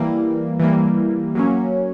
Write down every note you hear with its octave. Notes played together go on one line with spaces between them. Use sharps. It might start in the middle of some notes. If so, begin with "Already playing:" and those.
Already playing: E3 G3 A#3
E3 G3 A#3
F#3 A#3 C#4